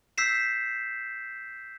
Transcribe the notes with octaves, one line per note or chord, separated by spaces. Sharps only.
E6 G6 B6 C7 E7